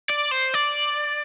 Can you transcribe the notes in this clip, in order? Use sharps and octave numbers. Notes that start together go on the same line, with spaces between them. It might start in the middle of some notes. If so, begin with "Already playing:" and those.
D5
C5
D5